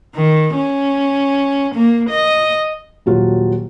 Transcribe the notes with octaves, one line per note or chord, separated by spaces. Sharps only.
D#3
C#4
A#3
D#5
D#1 F#3 F4